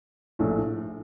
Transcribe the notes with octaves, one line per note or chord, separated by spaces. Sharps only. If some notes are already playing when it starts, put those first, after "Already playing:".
A#1 A2 A3 D4